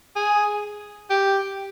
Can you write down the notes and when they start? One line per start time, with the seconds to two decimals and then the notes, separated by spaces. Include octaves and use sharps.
0.16 G#4
1.10 G4